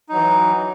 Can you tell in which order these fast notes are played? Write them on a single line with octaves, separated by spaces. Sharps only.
D#4 F#3 E3